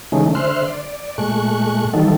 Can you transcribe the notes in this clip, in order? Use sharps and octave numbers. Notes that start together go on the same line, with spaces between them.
C#3 E3 G#3 A3 C#4 D#4
D3 C5 E5 C6 F6 F#6
D5
A#2 G#3 A3 C#6 F#6
D#3 E3 F#3 G3 D#4 A4